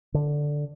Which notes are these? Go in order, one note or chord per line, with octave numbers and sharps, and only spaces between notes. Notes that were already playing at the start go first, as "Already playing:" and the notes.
D3